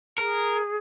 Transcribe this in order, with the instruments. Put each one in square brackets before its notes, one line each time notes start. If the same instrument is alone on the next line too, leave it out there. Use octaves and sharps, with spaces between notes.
[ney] G#4 [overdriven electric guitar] A#4